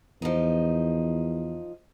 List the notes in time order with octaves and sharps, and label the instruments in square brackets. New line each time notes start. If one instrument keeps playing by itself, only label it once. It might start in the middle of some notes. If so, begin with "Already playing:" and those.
[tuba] E2 [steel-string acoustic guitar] F3 D#4